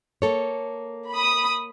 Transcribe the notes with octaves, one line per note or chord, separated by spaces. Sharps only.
A#3 A4 C#5
B5 D#6